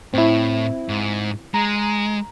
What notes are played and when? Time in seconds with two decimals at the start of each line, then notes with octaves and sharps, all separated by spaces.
0.14 A2 C4 E4
0.89 G#2
1.54 G#3 A#5